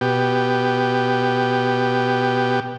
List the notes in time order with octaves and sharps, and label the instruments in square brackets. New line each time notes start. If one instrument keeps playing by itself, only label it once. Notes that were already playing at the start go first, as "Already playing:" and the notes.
[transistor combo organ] B2 G4